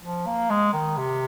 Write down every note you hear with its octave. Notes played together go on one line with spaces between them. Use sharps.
F3
A#3
G#3
D#3
C3